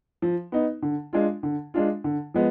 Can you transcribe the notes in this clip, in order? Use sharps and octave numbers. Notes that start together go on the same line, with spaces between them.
F3
B3 D#4
D3
G#3 D4 F4
D3
G#3 D4 F4
D3
F3 G#3 B3